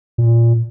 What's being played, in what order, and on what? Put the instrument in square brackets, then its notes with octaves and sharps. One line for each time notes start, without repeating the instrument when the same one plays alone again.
[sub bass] A#2